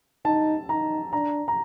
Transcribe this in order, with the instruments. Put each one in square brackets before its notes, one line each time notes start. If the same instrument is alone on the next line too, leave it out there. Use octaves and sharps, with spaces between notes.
[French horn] D#4 [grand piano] A5
[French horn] D#4 [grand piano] A#5
[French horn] D4 [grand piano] A#5
[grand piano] A#5